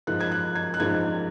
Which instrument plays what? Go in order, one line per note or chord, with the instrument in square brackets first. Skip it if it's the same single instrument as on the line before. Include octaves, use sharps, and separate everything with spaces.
[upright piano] G#2 F3 A#3 D#4 [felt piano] F#6
[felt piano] G#6
F#6
G#6
F#6
[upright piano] G#2 F3 A#3 D#4 [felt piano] G#6